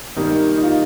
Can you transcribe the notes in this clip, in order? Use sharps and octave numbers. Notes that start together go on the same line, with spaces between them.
D#3 G3 A#3 D#4
D#4
F4